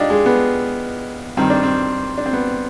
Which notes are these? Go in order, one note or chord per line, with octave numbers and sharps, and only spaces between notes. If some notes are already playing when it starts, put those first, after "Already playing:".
Already playing: D4 D#4 F4 G4
G#3
B3
G2 D#3 C4
D4
C4
D4
C4
B3